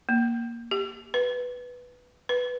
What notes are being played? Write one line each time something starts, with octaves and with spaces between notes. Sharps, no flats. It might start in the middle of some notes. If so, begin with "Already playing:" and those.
A#3
G4
B4
B4